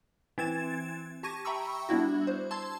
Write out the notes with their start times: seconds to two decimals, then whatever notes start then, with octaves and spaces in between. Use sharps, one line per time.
0.38 E3 C4 G#6 A6 E7
1.23 G4 A5 C#6 G#6 A#6 D#7
1.45 E5 G5 A#5 B5 C#6 E6
1.89 G3 B3 D4 E4 F#4
2.27 C5
2.51 A5 C6 E6 G#6